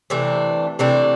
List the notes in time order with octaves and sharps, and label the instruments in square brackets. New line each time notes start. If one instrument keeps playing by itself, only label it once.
[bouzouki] C3 E3 A3 D4
C3 E3 A3 D4